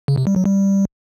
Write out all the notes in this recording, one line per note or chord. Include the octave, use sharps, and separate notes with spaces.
C#3
C3
G3
F#3
G3